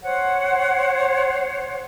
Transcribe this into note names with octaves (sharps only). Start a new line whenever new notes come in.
C5 C#5 F#5